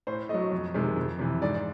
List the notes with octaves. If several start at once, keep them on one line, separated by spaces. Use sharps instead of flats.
A2 C5
F#3 A3 D#5
F2
C3 D#3 G#3
F2
C3 E3
G#2 D5
D5